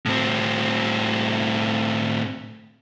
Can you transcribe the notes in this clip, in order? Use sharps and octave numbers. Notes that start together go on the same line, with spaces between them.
A2 C4